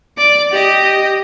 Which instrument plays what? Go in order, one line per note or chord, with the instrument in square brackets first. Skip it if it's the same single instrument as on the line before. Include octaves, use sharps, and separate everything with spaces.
[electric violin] D5 D6
G4 D#5